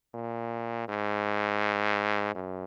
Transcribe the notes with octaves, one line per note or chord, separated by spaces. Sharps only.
A#2
G#2
F#2